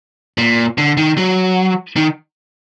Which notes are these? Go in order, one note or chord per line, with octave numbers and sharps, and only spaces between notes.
A#2
D3
D#3
F#3
D#3